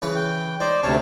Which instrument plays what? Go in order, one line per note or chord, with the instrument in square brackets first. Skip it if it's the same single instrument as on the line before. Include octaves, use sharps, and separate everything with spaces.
[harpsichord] C#3 E3 B4
[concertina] G5
[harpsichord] D#4 [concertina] C5 D5
[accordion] D2 C3 [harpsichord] C#4 [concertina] C#5 A5